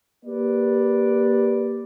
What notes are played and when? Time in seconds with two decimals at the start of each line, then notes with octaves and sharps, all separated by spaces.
0.25 A#3 G4 B4 D5